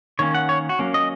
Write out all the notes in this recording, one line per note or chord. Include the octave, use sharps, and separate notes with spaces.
D#3 A#3 C#4 C#5
F#5
C#5
F#4
F#3 A#3 C#4
D#5